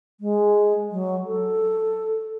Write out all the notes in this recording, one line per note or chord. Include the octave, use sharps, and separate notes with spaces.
G#3
F#3
A4